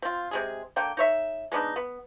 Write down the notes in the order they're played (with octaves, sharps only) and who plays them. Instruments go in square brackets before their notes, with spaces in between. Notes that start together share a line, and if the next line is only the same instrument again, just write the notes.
[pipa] C4 F4
C3 G#3 G#4
D3 A#3 G5
D#4 C#5 E5
G#3 B3 D4 D#4
B3